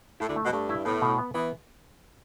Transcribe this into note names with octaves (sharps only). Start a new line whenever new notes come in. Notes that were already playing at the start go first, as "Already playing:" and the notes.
A2 A3 E4
D2 D3
A3
B2
G2 A3
E4
A2 B3
B2
B3
E3 B3